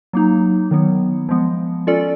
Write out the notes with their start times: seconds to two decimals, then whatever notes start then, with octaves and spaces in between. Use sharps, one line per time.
0.13 F#3 A#3 D#4
0.71 D#3 F#3 B3
1.29 F3 G#3 B3
1.87 C#4 F4 A4 D5